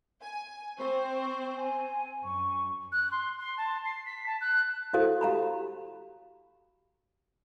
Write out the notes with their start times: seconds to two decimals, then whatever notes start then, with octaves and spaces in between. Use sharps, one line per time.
0.22 G#5
0.79 C4 C5 C#6
1.57 G#5
2.24 F#2 C#6
2.92 F#6
3.11 C6
3.39 C6
3.58 A5
3.85 C7
4.06 B6
4.26 A5
4.41 F#6
4.93 E4 F#4 A4 C5 F5 D#6
5.21 G4 F5 A#5 B5